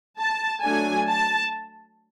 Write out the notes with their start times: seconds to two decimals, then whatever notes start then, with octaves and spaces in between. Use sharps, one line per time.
0.19 A5
0.63 F#3 A3 D4 G#5
1.08 A5